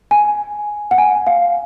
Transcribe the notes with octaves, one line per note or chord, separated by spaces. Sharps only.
G#5
F#5
G#5
F5